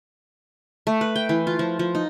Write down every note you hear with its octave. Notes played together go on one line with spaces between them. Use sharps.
A3
B4
G5
E3
F4
F3
F3
D#4